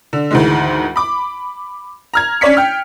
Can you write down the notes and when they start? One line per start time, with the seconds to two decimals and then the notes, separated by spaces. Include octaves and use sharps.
0.13 D3
0.31 D2 G#2 D#3 E3 G#3
0.96 B5 D6
2.14 A#5 F6 G#6
2.41 C#4 D4 C#5 D5 B6 C#7
2.57 G5 F6